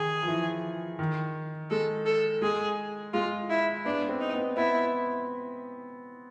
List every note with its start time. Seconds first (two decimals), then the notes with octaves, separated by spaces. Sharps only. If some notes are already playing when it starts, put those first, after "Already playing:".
Already playing: D#3 G#4
0.22 F3
0.28 E3
0.99 D#3
1.71 G#3 A4
2.06 A4
2.42 G#3 G#4
3.13 G#3 F4
3.50 E4
3.85 B3 D4
4.09 C4
4.21 D#4
4.33 B3
4.57 B3 E4